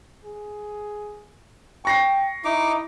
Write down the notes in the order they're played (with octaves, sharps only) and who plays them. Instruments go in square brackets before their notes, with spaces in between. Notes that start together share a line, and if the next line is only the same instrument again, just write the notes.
[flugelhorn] G#4
[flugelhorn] G5 [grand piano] C#6 A#6 C7
[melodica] D#4 D6 [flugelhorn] E4